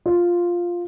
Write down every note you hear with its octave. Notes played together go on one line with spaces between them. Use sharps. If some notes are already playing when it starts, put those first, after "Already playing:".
F4